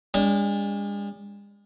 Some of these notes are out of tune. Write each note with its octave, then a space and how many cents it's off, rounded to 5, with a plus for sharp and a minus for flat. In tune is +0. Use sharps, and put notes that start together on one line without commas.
G#3 -40 D4 -30